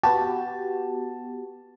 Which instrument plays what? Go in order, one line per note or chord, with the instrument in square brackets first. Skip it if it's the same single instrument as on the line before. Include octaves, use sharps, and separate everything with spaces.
[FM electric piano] B3 F#4 G4 [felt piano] A5